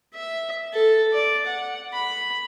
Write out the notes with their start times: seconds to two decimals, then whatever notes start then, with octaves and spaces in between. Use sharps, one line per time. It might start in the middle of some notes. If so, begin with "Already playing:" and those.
0.14 E5
0.73 A4
1.13 D5
1.46 F#5
1.93 B5